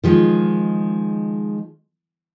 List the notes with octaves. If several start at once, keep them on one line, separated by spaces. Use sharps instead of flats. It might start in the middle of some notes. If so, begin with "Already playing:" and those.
D#3 F3 G#3